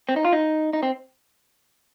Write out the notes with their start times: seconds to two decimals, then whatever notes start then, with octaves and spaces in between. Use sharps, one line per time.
0.09 C4
0.16 D#4
0.25 F4
0.33 D#4
0.73 D#4
0.83 C4